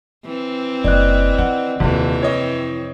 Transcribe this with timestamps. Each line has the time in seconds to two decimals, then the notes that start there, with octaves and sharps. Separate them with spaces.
0.24 E3 C4
0.84 F#1 D5 D#5 F#6
1.38 D#3 F#5
1.80 D#1 F2 C3 E3 C4
2.22 E4 C#5 D#5